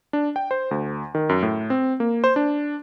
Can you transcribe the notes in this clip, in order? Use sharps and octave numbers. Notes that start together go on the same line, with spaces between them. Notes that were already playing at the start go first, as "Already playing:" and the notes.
D4
G5
C5
D2
D#3
F#2
A2
C4
A#3
C5
D4